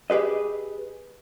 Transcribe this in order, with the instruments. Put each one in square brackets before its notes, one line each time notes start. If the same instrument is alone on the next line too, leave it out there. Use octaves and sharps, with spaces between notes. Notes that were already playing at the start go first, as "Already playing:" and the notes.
[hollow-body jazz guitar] G4 G#4 B4 D#5